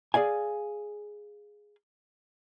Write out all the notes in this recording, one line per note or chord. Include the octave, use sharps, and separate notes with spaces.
G#4 D5 F5 G#5